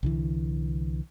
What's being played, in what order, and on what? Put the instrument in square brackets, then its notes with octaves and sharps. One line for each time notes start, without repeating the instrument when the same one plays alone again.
[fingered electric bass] C2 D3 E3